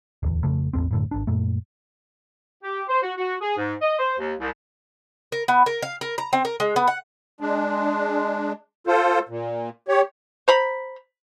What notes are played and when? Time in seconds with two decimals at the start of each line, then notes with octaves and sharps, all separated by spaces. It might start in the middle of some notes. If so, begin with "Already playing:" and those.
0.23 D1 E2
0.44 F2 C#3 A3
0.73 A1 E2 G2 C4
0.91 F#2 A2 D3
1.11 G#1 D4
1.27 F#2 A#2 A3
2.63 G4
2.88 C5
3.02 F#4
3.18 F#4
3.41 G#4
3.57 G#2
3.82 D#5
3.99 C5
4.19 D#2
4.39 C2
5.32 A#4
5.48 B3
5.66 A#4
5.82 F5
6.01 A#4
6.18 A#5
6.33 C4
6.45 A#4
6.60 G#3
6.76 B3
6.88 F#5
7.41 G#3 D4
8.87 F4 A4 C5
9.29 A#2
9.88 G4 C#5
10.48 C5 A#5 B5